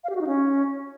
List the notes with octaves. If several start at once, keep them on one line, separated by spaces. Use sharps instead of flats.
F5
G4
F#4
D#4
C#4